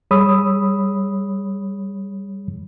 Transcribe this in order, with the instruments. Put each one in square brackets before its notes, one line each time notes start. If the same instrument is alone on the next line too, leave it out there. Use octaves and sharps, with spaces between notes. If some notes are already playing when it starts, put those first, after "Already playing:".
[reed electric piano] G3 G#4 C#5 B5 D#6 E6